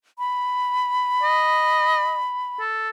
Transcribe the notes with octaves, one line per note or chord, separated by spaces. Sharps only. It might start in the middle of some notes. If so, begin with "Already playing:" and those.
B5
D#5
A4